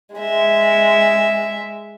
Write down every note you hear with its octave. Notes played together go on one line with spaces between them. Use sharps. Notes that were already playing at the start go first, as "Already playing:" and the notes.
G#3 E5